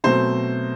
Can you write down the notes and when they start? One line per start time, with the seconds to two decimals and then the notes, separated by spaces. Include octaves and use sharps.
0.04 B2 F#3 A3 C4 C5